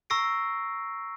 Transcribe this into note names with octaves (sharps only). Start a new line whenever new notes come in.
A#5 C#6 E6 A#6 C7 D7